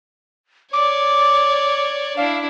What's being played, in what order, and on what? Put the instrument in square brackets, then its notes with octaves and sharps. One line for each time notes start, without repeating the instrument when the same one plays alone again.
[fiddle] C#5 D5 [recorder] D6
[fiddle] D4 E4 [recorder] F5